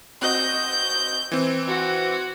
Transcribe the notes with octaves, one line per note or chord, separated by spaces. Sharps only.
C4 F#4 D#5 G6
E3 C4
F#4